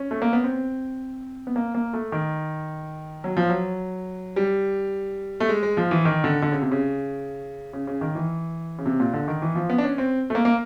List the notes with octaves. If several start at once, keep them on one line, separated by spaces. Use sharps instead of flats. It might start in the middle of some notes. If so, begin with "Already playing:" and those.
Already playing: C#4
A3
A#3
B3
C4
B3
A#3
A#3
A3
D#3
F#3
F3
F#3
G3
A3
G#3
G#3
F3
E3
D#3
D3
D3
C#3
C3
C#3
C#3
C#3
D#3
E3
C#3
C3
A#2
D3
D#3
E3
F3
B3
D4
C#4
C4
A3
A#3
A#3